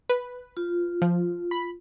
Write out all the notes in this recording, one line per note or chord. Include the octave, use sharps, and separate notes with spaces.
B4
F4
F3
B5